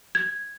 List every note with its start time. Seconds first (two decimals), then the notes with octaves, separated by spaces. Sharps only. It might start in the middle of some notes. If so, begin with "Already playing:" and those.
0.15 G#6